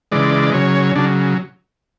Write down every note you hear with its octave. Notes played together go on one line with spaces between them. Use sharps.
C#3 E3 G#3 D5
C#3 F#3 C#5
C#3 F#3 D4